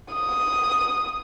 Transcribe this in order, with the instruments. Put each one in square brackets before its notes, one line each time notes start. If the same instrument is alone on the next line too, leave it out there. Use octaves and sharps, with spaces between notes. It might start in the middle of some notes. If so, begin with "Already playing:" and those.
[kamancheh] D#6